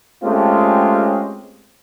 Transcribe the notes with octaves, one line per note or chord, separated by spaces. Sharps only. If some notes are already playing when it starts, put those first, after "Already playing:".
G#3 A3 C4 C#4 F4 G4